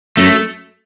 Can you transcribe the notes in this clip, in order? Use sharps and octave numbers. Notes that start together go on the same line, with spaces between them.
F#2 A3